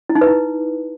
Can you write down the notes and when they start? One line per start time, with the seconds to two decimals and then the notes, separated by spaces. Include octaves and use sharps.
0.09 E4
0.15 D#4
0.21 B4
0.27 E4